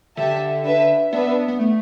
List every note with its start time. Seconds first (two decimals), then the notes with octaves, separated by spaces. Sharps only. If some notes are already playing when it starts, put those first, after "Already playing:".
0.17 D3 G4 E5 A5
0.65 D4 B4 E5
1.12 B3 D4 B4 E5
1.48 B3
1.59 A3